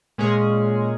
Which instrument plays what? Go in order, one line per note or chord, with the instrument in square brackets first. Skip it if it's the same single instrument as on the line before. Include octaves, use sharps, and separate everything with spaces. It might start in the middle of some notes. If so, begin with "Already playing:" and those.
[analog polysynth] A#2 G#3 C#4 G#4